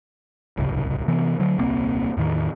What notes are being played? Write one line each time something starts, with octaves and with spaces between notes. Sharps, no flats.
D1 G1 C2 C#3
C3 E3 B3
D3 F#3
D#1 C2 A#3 C4
E2 A2 D#3